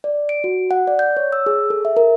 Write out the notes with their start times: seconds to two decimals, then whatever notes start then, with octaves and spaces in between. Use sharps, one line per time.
0.04 D5
0.29 D7
0.44 F#4
0.71 F#5
0.87 D5
0.99 G6
1.17 C#5
1.32 E6
1.46 G#4
1.70 A4
1.85 E5
1.96 A#4